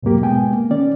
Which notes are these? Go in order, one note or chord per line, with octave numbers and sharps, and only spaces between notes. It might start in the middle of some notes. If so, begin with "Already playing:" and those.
E2 G#2 B2 F#3 A#3 G4
B2 G#3 B3 G5 G#5
A#3
D#3 C#4 D5